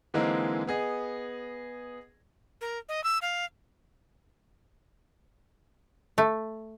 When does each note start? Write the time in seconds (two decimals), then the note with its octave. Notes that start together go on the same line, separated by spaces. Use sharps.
0.14 D3 E3 G#3 A#3 C4 D#4
0.67 B3 G#4 D#5
2.61 A#4
2.89 D#5
3.04 E6
3.22 F5
6.18 A3